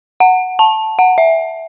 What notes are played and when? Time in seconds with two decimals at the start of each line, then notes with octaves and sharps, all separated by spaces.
0.20 F#5
0.59 A5
0.99 F#5
1.18 E5